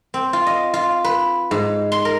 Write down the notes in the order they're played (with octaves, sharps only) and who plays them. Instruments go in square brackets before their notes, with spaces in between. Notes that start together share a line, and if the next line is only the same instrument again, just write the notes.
[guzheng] C4
F4
D#5
F4
B4
G#2
C6
A#4